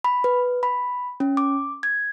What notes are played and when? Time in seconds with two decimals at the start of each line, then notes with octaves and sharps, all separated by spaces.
0.04 B5
0.24 B4
0.63 B5
1.20 C#4
1.37 D6
1.83 G#6